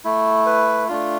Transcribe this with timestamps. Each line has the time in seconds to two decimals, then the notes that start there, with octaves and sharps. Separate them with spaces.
0.05 A3 E4
0.46 B4
0.89 A3 D4 F4